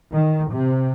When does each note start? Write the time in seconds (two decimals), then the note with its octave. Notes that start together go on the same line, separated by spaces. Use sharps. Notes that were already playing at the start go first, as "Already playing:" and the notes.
0.13 D#3
0.51 C3